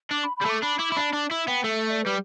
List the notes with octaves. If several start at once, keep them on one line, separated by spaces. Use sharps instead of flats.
D4 D6
B5
G3 B5
A3 D6
D4 B5
E4 D6
E4
D4 B5
D4 A5
E4 E5
B3 G5
A3 E5
E5
D5
G3 B4